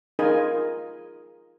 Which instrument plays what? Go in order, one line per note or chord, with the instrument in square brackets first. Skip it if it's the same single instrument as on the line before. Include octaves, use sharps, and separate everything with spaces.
[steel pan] D#4 F4 G#4 A#4 D#5 G#5